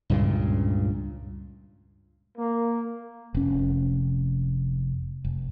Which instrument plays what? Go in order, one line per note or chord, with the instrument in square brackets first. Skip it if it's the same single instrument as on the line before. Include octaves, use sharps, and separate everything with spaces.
[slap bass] C#2 G2 A#2 C#3
[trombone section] A#3
[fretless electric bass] F1 C#4
F1